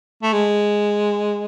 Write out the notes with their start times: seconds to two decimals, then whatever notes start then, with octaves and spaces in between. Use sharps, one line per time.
0.23 A3
0.33 G#3